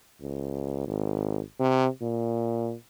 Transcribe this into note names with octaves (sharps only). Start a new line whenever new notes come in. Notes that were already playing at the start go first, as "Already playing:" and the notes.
C#2
G#1
C3
A#2